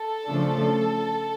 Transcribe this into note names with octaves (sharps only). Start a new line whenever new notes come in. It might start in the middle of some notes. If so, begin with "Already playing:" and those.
Already playing: A4
C#3 F3 A3 D4